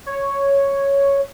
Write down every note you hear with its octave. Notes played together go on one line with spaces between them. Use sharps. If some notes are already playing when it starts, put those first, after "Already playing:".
C#5